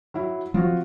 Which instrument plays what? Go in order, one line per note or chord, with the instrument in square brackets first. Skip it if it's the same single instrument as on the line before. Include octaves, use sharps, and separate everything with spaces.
[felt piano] F#3 E4
[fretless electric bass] F3 F#3 C4 [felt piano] F4 F#4